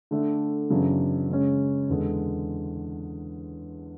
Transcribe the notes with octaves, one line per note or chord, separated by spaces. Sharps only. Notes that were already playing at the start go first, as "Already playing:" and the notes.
D3 A3 D4
F#2 C#3 E3 B3 D4
C#3 G#3 C#4
E2 D3 G#3